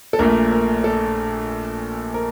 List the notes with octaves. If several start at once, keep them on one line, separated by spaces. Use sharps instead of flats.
A4
A#1 A#2 A3 A#4
A#4
A4
A#4